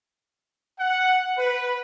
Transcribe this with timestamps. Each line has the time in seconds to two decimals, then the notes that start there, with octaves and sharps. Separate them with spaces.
0.79 F#5
1.37 B4